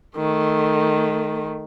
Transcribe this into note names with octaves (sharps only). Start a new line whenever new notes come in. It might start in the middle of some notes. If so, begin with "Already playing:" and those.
D#3 A3